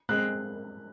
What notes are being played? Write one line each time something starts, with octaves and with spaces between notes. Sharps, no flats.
G#3 C4 F#6